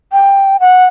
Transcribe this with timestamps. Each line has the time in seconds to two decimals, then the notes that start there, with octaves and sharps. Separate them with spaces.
0.12 G5
0.60 F#5